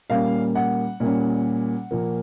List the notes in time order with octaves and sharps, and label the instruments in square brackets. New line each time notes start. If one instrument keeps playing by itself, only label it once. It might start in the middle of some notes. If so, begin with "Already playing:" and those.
[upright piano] A#2 G3 A#3 C#4 F5
F#5
A#2 G3 A#3 C#4
A#2 F3 A#3